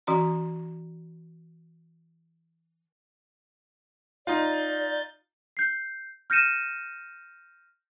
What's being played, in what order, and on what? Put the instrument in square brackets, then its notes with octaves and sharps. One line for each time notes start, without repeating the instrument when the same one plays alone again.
[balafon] E3 C#4 F#4 A#5
[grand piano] D#4 F4 [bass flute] D5 [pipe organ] G6 A6
[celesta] G6 C7
F6 G6 A#6 C#7 D#7 E7